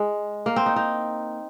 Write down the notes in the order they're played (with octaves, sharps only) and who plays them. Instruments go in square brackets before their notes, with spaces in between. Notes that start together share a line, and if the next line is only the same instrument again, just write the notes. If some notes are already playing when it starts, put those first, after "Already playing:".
Already playing: [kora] G#3
A#3
C4
D#4
D#4